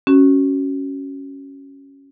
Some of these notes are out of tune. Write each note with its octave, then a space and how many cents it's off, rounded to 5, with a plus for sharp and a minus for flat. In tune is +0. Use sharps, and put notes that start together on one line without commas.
C#4 +0 F#4 +20